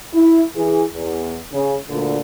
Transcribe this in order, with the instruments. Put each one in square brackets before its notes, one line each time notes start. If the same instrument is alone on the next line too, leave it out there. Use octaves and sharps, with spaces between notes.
[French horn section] E4
E3 G#4
E2
C#3
D2 A#2 D3